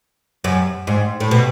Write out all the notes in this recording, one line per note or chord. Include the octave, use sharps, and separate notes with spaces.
F#2
G#2
A2
B2